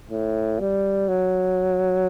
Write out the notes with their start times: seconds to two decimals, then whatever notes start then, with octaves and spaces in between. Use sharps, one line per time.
0.11 A2
0.60 G3
1.08 F#3